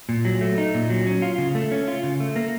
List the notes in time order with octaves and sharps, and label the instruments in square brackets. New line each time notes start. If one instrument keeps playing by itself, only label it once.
[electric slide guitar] A#2
F#3
A3
D#4
A#2
F#3
C#4
F4
C#3
A3
C#4
F4
C#3
A3
A#3